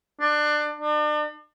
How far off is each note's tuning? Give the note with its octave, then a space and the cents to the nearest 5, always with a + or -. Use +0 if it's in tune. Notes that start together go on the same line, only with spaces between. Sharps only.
D4 +25
D4 +40